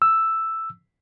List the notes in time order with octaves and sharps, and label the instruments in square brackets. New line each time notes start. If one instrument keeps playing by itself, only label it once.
[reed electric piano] E6